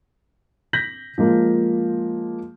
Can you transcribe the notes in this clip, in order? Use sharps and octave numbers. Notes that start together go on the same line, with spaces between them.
G6 A#6 B6 F#7
F3 G#3 A#3